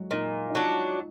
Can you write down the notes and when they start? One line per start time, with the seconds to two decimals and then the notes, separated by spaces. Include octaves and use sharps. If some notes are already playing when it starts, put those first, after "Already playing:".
Already playing: F#3 G#3 F#4
0.11 A#2 D#4
0.50 D#4
0.55 F#3 D4 F4